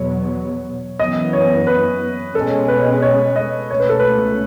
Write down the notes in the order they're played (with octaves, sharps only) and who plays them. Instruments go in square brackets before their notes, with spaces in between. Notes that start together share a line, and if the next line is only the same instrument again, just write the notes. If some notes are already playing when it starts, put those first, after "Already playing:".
Already playing: [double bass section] E2 B2 F#3 B3 [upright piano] C#5
[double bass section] F#2 E3 B3 [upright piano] D#5
[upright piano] C#5
B4
[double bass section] B2 G#3 C#4 [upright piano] A4
[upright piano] B4
C#5
D#5
[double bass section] C#2 B2 A3 C#4 [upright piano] C#5
[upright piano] B4
A4
B4